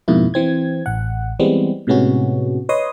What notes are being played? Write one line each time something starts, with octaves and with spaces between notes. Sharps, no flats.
F2 G#2 B2 A#3 E4
E3 C4 G#6
A1 F#5
E3 G3 G#3 B3 C4
A2 C3 G#3 B3 C#4 F#4
B4 C#5 D#5 C6 D#6